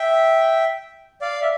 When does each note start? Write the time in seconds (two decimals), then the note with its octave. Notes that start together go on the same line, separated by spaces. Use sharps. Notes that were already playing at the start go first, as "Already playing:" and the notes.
Already playing: E5 G5
1.21 D5 F5
1.42 E5